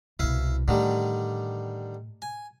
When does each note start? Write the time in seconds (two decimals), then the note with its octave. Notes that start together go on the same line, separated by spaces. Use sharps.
0.19 C2 B2 E4 F5
0.68 A2 D3 D#3 G3
2.22 G#5